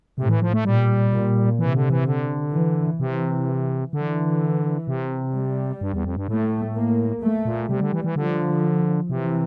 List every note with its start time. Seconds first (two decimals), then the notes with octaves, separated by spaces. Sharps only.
0.18 A2 C3
0.29 E3
0.42 F3
0.54 A3
0.65 A#2 G3
1.12 A#2
1.59 C3 E3
1.75 D3
1.90 E3
2.06 D3
2.53 E3
3.00 C3 E3
3.93 D3 E3
4.88 C3
5.34 G3
5.81 G2
5.94 E2
6.05 F2
6.17 G2
6.28 A2 A3
6.75 A#3
7.23 A3
7.45 A#2
7.69 C3 G3
7.81 D3
7.93 E3
8.04 E3
8.16 D3 F3
9.10 C3 E3